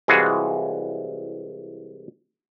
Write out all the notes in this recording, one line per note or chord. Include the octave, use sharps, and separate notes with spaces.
C2 E3 G#3 F4 F#4 G#4